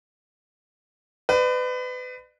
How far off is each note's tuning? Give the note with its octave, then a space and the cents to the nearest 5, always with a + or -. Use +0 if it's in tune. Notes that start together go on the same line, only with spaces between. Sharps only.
B4 +30 D5 +40